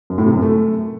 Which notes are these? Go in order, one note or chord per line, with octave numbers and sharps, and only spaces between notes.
F#2
A2
C3
F#2
A3